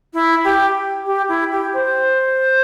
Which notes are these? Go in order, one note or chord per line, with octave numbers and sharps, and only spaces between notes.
E4
G4
G4
E4
G4
C5